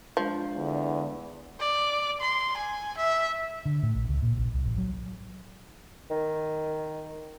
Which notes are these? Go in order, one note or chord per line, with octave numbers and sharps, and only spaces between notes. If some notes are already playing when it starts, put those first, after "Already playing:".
F3 G#3 D4
E2 D3
D5
C6
G#5
E5
D3
A2
A#1
C#2
A#2
A#1
C2
A1
F#3
D#3